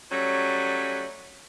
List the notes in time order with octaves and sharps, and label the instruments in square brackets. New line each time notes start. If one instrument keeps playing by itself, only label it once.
[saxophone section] F#3 G3 A3 C#4